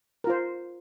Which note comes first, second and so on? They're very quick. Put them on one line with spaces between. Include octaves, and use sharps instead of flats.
A#4 F4 C5